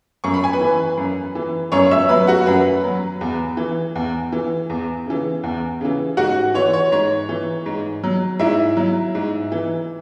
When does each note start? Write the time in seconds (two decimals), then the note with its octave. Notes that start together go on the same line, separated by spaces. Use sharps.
0.24 F#2 C#6
0.34 B5
0.44 G#5
0.53 B4 B5
0.60 E3
0.98 F#2
1.35 E3
1.72 F#2 C#5 C#6
1.91 E5 E6
2.09 F#3 B4 B5
2.27 F#4 F#5
2.46 F#2 B4 B5
2.84 F#3
3.21 E2
3.57 E3
3.95 E2
4.32 E3
4.70 E2
5.06 C#3 E3
5.43 E2
5.81 C#3 E3
6.17 G#2 F#4 F#5
6.54 E3 C#5
6.73 C#5
6.92 G#2 C#5
7.29 E3
7.66 G#2
8.04 F#3
8.39 G#2 E4 E5
8.77 F#3
9.15 G#2
9.52 E3